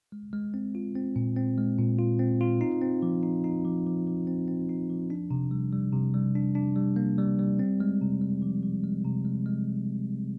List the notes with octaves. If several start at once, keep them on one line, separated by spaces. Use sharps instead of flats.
G#3
G#3
C4
F4
C4
A#2
C4
G#3
A#2
F4
C4
F4
D#4
C4
F3
D#4
D#4
F3
F3
F3
C4
C4
D#4
F3
D4
C3
G3
G3
C3
G3
D4
D4
G3
A#3
G3
G3
C4
G#3
C3
G#3
F3
F3
G#3
C3
G#3
G#3